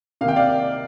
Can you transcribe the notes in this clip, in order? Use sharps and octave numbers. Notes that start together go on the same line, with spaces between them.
C3 D#3 A#3 F5
G5
D5 F5